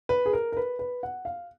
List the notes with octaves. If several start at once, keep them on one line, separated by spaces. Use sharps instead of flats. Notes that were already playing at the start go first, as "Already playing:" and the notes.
B4
G#4
A#4
A#4
B4
B4
F#5
F5